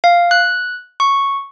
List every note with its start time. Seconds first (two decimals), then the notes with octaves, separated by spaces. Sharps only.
0.04 F5
0.31 F#6
1.00 C#6